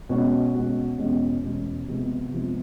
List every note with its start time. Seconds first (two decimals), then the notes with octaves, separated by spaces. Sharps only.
0.09 B2 G#3 C#4 F#4
0.54 B2 G#3 C#4 F#4
0.98 E2 B2 G#3 C#4
1.42 E2 B2 G#3 C#4
1.87 C3 F3 G#3 B3
2.31 C3 F3 G#3 B3